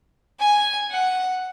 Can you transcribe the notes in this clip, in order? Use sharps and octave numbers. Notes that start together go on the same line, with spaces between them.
G#5
F#5